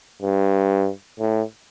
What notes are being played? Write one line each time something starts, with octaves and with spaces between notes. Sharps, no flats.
G2
A2